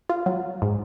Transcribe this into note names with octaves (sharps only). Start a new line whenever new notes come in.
F4
F#3
G#2